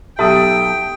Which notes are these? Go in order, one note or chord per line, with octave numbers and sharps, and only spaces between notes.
B1 G4 A4 E5 G5 D#6